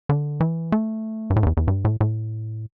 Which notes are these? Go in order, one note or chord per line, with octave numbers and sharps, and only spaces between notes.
D3
E3
A3
G2
A2
G2
E2
E2
G2
A2
A2